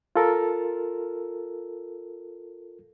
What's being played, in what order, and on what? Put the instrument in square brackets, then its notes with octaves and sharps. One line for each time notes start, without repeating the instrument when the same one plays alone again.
[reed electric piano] F4 A4 A#4